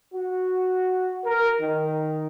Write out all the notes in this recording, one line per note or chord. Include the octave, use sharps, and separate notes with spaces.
F#4
A#4
D#3